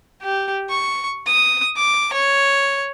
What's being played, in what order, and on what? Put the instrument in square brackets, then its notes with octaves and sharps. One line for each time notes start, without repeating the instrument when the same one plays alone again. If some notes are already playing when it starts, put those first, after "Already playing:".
[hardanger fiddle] G4
C#6
D#6
D6
C#5